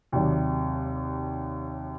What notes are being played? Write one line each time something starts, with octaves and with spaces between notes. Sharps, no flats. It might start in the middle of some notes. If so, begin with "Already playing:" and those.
D#2 C3 F#3 D5